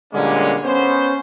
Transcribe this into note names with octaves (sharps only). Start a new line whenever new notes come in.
A#2 D3 G3 G#3 A#3 C#4
B3 C#4 C5